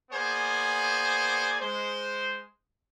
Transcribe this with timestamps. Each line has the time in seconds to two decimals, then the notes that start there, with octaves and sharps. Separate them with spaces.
0.11 A#3 B3 G#4 C5 D5 G#5
1.60 G#3 C5